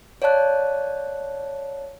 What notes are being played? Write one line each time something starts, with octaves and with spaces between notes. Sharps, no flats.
C#5 D5 F5 A5 F#6